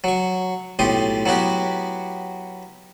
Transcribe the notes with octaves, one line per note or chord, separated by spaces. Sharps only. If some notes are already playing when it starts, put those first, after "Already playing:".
F#3 C#6
B1 A2 G4 C6 D#6
F#3 B3 E4 F#4 G4